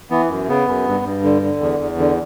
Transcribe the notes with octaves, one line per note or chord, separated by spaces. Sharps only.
E3 B3
F#2
C#3 B3
F#2
G2
G2
D3
D3
E2
E2
D3